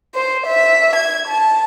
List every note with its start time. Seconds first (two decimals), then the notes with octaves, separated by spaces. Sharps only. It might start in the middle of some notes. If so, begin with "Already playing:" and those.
0.13 C5
0.46 E5
0.94 G#6
1.27 A5